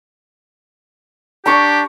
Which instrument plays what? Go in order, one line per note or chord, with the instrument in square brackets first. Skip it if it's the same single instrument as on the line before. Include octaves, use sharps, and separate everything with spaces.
[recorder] D4 [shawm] G4 [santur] A#5 C#6